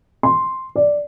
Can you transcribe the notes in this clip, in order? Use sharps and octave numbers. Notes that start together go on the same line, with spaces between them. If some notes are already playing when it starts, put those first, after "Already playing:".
C6
D5